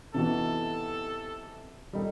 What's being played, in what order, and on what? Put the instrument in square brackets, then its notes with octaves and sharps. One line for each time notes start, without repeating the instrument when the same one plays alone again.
[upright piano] C3 E3 B3 D#4 F#4 [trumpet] A4
[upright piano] G3 D#4 A4